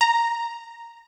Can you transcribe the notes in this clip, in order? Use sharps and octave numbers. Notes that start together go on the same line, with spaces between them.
A#5